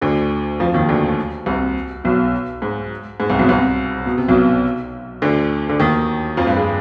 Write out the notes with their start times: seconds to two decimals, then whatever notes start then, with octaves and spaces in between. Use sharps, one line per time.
0.01 D2 D3
0.60 F2 F3
0.74 D#2 D#3
0.88 D2 D3
1.46 C2 C3
2.04 B1 B2
2.62 G#2
3.20 G#2
3.29 C2 C3
3.39 B1 B2
3.49 C2 C3
4.06 B2
4.18 C3
4.28 B1 B2
5.22 D2 D3
5.69 D3
5.80 D#2 D#3
6.37 F2 F3
6.47 G2 G3
6.57 G#3